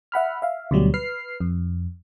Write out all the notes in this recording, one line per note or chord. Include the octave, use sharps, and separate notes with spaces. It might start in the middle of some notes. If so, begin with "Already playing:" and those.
E5 F#5 B5 F6
E5 F5
D2 B2 F#3 G3
B4 F6 C7
F2